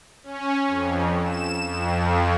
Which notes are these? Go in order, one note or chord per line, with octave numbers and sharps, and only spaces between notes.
C#4
F2
E7
F2